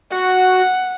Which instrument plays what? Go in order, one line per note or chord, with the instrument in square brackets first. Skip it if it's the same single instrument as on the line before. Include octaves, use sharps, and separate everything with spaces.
[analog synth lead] F#4 [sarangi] F#5